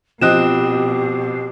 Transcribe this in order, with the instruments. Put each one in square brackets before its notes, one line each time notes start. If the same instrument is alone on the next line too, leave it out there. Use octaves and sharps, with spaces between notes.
[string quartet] B2 [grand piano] F3 C4 D#5 [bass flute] G4 [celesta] D#6 F#6 E7